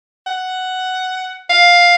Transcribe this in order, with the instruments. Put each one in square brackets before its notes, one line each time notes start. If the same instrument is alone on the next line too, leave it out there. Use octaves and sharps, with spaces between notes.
[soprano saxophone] F#5
F5